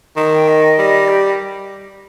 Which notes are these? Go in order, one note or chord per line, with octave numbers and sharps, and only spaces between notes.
D#3
G5
D#5
G3
G4